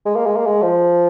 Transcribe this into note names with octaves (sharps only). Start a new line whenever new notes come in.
G#3
A#3
G#3
A#3
G#3
F3